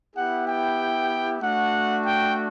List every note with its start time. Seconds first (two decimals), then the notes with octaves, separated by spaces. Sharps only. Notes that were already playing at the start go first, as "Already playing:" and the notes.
0.15 B3 E4 G4 F#5
0.47 G5
1.41 A3 D4 F#4 F#5
2.05 G5